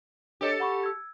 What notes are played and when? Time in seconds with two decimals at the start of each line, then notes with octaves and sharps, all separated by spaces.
0.41 D4 G4 A4 C#5 D#5
0.60 F#5 B5 C#6
0.83 E6 G#6